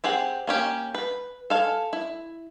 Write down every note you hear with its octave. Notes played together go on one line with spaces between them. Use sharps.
C4 G4 G#4 F#5
A#3 C#4 G4
B4
A4 F5 G#5
E4